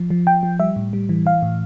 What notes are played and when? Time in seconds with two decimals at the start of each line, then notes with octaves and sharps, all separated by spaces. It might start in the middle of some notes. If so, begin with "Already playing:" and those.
Already playing: F3
0.10 F3
0.27 F3 G5
0.43 F3
0.60 G3 E5
0.76 A2
0.93 G3
1.09 E3
1.26 E3 F5
1.42 A2